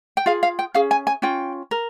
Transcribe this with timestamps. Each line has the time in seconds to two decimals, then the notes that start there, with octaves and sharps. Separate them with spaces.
0.17 G5
0.26 F4 G#4 F5
0.43 F5
0.59 G5
0.74 C#4 G#4 F5
0.91 G#5
1.07 G#5
1.22 C#4 F4 G5
1.71 A#4